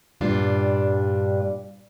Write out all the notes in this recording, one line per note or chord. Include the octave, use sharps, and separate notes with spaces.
G2 A#2 G3 D4 F4